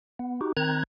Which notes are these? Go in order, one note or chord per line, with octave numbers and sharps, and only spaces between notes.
B3
D#4 F#4 G4
D#3 C4 A#5 F#6 G#6